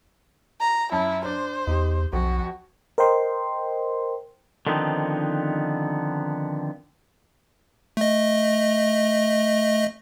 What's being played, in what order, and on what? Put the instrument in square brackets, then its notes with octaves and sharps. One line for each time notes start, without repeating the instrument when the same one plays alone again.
[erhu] A#5
[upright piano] F#2 A5 [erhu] E4
[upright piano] D4 [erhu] C5
[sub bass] E2 [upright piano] D#4 G4
[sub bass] B1 [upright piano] F2 [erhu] F#4
[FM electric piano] A#4 C5 D#5 G5 C6
[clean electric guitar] D3 D#3 F3 B3 C4 D#4
[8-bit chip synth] A3 D#5